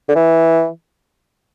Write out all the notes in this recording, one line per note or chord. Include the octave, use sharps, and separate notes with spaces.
D3
E3